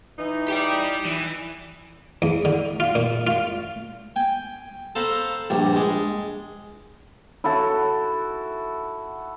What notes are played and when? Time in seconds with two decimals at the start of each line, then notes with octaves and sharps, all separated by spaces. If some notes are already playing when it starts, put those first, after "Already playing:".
0.18 E3 D#4
0.48 G4 D5
1.05 E3
2.22 E2
2.45 D3
2.80 F4
2.95 A#2
3.27 F4
4.16 G5 G#5
4.95 A4 C5 F5 A#5 B5
5.50 A#1 G2
5.76 G#3
7.44 E4 F#4 A4